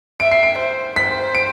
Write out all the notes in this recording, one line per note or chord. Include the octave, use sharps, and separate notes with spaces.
E5 D7
C7
D7
C5
C5 B6
D7